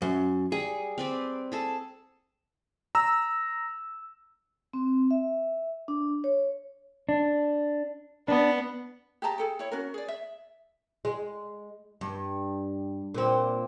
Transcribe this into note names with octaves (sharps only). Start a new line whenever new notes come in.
F#2
G3 G#4
C4 B4 D5
G#4 A4 A5
A#5 E6
C4
E5
D4
C#5
D4
B3 D4
G4 G#4 A5 A#5
G#4 A4 G5
E4 C#5
C#4 F#4 A#4
G#4 D5
E5
G#3
G2
A#2 C4